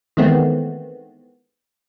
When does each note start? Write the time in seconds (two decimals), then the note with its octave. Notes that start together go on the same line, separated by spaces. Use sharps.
0.17 D#3 E3 G#3 A3 B3 C4